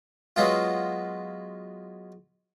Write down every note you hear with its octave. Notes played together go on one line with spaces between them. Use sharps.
F#3 G#3 B3 F4